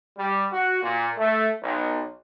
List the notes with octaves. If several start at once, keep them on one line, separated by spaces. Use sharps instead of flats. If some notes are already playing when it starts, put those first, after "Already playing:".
G3
F#4
A#2
A3
B1